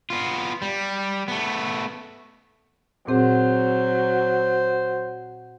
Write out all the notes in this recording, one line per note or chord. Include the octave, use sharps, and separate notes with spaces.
B3 F4
G3
A3 B3
A#2 F#3 C4 G#4 C5